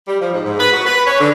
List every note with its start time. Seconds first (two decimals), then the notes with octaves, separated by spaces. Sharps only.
0.06 G3
0.21 F3
0.33 G#2
0.45 G#2
0.59 B4
0.73 F#4
0.85 B4
1.06 C#5
1.19 D3